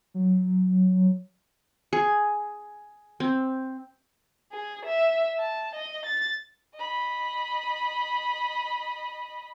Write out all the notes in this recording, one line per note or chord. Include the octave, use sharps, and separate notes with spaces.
F#3
G#4
C4
G#4
E5
A5
D#5
A6
D#5 B5